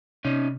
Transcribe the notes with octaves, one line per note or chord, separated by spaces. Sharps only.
C3 C#4 D#4